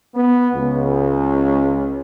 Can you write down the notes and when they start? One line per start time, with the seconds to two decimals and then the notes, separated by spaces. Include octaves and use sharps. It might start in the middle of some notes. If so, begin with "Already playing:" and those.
0.15 B3
0.54 C#2